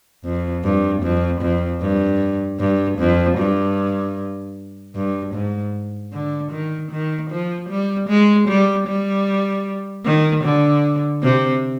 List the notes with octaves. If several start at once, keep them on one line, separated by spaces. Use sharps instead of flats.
F2
G2
F2
F2
G2
G2
F2
G2
G2
G#2
D3
D#3
D#3
F3
G3
G#3
G3
G3
D#3
D3
C3